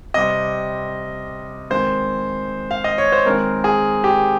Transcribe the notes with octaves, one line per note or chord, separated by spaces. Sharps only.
C3 G3 C4 D#5
D#3 G#3 C4 C5
F5
D#5
C#5
C5
D#3 G#3 C4 A#4
G#4
G4